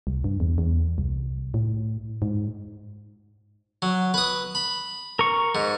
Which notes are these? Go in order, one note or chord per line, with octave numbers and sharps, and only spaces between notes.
C2
G2
E2
E2
C2
A2
G#2
F#3
B4 D#6
B5
A#4 C#6
G#2